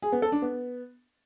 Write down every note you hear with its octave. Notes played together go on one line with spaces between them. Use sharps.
G#4
B3
A4
D4
B3